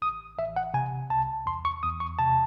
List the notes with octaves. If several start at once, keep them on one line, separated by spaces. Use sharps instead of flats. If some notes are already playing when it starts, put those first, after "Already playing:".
A1 D#6
A1 E5
F#5
C3 G#5
C2 A5
E2 C6
C#6
E2 D#6
C#6
C3 A5